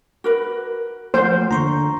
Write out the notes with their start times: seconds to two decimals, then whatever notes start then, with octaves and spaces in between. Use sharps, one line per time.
0.24 F#4 A#4 B4
1.14 F3 A3 A#3 C5 F#5
1.51 D3 A#5 C6 C#6